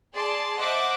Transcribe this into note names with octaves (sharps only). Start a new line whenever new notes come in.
G#4 D5 A5 C6
C5 D#5 E5 F#5 A5 D6